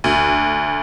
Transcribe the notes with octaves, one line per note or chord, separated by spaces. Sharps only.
D2